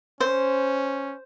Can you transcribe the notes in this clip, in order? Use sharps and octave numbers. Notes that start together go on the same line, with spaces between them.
C#4 C5